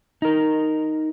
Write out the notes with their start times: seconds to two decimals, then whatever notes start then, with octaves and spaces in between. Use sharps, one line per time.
0.22 D#4 A#4